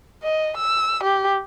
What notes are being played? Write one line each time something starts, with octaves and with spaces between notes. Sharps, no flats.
D#5
E6
G4